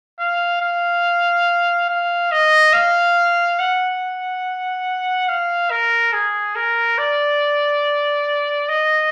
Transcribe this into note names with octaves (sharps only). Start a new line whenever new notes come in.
F5
F5
F5
D#5
F5
F#5
F5
A#4
G#4
A#4
D5
D#5